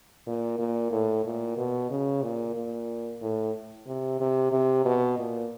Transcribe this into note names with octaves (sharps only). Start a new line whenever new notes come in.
A#2
A#2
A2
A#2
B2
C#3
A#2
A#2
A2
C3
C3
C3
B2
A#2